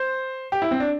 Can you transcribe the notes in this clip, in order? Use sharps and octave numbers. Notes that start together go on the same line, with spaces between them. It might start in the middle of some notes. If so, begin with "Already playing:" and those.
Already playing: C5
G4
E4
C4
D4